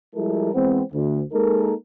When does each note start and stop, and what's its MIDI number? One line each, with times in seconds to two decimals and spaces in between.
0.15 0.53 53
0.15 0.53 55
0.15 0.53 56
0.15 0.53 64
0.15 0.53 69
0.15 0.53 70
0.53 0.82 52
0.53 0.82 56
0.53 0.82 59
0.53 0.82 60
0.93 1.22 38
1.32 1.73 56
1.32 1.73 58
1.32 1.73 63
1.32 1.73 69
1.32 1.73 70